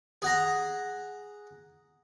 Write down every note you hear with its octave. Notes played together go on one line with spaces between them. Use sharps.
G#4 F#5 A#5